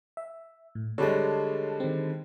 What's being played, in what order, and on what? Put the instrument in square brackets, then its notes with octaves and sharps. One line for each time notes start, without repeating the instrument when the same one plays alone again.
[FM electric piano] E5
A2
[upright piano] D3 G3 G#3 [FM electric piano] C#5 A5
[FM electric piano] D#3 C4